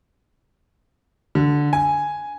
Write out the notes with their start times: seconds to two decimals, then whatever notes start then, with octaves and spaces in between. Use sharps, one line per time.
1.35 D3
1.73 G#5